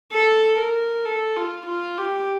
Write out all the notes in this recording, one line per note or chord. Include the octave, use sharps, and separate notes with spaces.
A4
A#4
A4
F4
F4
G4